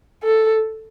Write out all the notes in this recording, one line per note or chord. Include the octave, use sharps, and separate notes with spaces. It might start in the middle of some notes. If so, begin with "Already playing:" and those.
A4